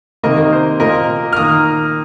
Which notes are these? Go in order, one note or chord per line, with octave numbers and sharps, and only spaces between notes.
C3 D#3 A#3 A#4 D#5
A#4 D#5
C5
A#2 A#3 A#4 D#5
F6
D#3 A#3 A#5 D#6